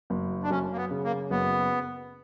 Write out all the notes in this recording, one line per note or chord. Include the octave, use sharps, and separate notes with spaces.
F#1
D4
F#2 C#4
A#3
B3
C#3
A#3
F#1 B3